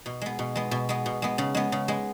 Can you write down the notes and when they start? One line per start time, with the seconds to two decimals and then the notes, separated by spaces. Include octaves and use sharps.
0.06 B2
0.21 G#3 B3
0.39 B2
0.55 G#3 B3
0.71 B2
0.89 G#3 B3
1.06 B2
1.22 G#3 B3
1.38 C#3
1.55 G#3 B3
1.72 C#3
1.88 G#3 B3